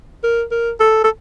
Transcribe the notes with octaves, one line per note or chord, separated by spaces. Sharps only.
A#4
A#4
A4
A4